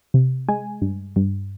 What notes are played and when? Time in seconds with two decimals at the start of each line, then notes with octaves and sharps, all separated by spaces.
0.14 C3
0.49 G#3 G#5
0.82 G2
1.16 G2